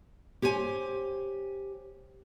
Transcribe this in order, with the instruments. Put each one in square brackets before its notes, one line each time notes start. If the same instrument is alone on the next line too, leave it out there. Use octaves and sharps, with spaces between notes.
[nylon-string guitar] G4 C5 C#5 G#5